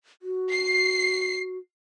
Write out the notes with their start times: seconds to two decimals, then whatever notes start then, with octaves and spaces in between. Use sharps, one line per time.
0.22 F#4
0.51 C7